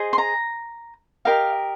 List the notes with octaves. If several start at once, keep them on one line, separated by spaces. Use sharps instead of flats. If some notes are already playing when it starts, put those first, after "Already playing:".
Already playing: G#4 C5 D#5
C6
A#5
G4 A#4 D#5 F5